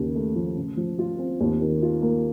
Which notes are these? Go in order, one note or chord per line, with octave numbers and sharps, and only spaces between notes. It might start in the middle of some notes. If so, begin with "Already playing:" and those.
Already playing: D#2 C#3
A3
F3
C#3
F3
F4
C4
D#2
D#3
F4
A#3